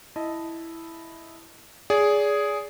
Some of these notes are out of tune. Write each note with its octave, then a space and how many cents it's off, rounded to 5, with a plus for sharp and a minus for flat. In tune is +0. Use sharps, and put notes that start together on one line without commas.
E4 +0 D#5 +0 A5 +0
G#4 +0 D5 -35